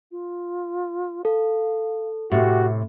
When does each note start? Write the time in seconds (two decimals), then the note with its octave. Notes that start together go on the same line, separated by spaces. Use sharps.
0.11 F4
1.25 A4 F5
2.31 A2 C3 F#4 G4